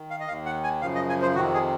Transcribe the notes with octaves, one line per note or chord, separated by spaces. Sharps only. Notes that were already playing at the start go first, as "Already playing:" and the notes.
Already playing: D#3
F5
D#5
D#2 D#3 F5
F#5
G#5
F#2 C#3 F3 F5
D#5
G#5
C5
F2 C3 D#3 F#4
G#4